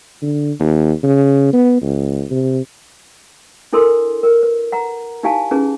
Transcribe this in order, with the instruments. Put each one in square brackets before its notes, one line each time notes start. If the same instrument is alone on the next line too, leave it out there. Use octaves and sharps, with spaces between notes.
[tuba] D3
D#2
C#3
B3
C#2
C3
[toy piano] D4 E4 A4 A#4 C6
A#4
B4
F#5 A#5
D#4 E4 G4 F5 G#5 A5
C#4 D#4 E4 G#4 B4